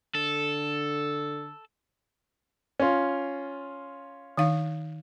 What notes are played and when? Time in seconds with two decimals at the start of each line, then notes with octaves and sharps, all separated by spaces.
0.15 D3 A4
2.80 C#4 F4
4.37 D#3 D#4 F5